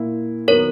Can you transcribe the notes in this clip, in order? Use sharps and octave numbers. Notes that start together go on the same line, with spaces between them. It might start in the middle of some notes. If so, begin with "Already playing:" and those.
Already playing: A#2 A#3 E4
D#3 F#3 B3 A#4 C#5